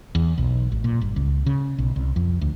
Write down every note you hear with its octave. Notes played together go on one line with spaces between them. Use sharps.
E2
B1
A1
A#2
G1
C#2
C#3
B1
C2
F2
D2